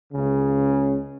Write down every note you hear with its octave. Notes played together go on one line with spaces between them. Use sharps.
C#2 C#3